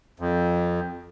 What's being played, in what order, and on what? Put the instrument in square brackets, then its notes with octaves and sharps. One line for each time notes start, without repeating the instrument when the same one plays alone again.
[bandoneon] F2